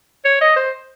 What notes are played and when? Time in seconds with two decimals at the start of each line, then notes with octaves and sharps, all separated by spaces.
0.25 C#5
0.41 D#5
0.56 C5